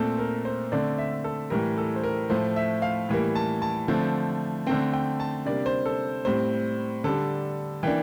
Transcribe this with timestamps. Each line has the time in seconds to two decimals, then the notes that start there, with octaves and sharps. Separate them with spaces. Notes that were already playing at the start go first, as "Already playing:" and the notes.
Already playing: A#2 A3 C4 A4
0.18 A#4
0.45 C5
0.72 D3 A3 C4 D5
0.98 E5
1.24 A4
1.50 A2 E3 G3 A#4
1.78 A4
1.96 C5
2.04 A#4
2.30 A2 F3 A3 C5
2.56 E5
2.82 F5
3.09 A2 E3 G3 A#3
3.35 A5
3.62 A5
3.88 D3 F3 A3 C4
4.67 D3 A3 C4 G5
4.94 G5
5.20 A5
5.46 C3 G3 A#3 D4 D5
5.66 C5
5.86 A4
6.25 A2 G3 C4 C5
7.04 D3 G3 D4 A4
7.83 E3 A#3 D4 G5